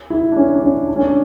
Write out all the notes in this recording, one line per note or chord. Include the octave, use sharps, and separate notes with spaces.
E4
D4
C#4
D4
C#4
D4
C#4
D4